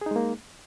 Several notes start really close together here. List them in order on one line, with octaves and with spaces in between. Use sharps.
G#4 D#4 G#3 A#3